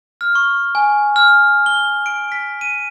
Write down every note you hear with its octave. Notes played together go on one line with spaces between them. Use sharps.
F6
C#6
G#5
F6
G7
D7
B6
D#7